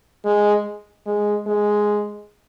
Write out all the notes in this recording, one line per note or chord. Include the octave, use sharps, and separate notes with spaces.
G#3
G#3
G#3